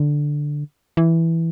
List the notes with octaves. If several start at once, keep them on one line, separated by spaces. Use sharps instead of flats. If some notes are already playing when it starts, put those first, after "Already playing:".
Already playing: D3
E3